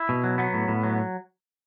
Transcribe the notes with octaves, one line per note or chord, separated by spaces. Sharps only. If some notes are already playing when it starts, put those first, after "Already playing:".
Already playing: E4
B2
F#3
F#3 B3
A2
A2
F#3